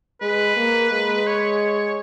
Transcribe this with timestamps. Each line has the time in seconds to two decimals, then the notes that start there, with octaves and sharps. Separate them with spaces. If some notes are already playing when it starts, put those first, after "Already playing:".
0.21 G#3 B4
0.56 A#3
0.91 G#3
1.27 C#5